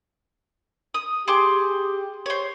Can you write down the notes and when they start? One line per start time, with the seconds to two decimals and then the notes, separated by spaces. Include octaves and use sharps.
0.94 D#6
1.28 G4 G#4 C6 D6
2.26 C5 C#5